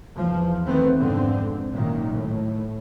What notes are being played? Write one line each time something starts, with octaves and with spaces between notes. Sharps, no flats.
E2 F3
D#3 A3 B3 C4
F2 G#2 D3 C4
F#2 A#2 D#3
A2